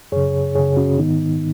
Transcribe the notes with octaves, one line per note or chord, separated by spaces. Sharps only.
F#2 C#3 G#4 C#5
F#2 C#3 G#4 C#5
C#4 F#4
G#2 D#3 B3 D#4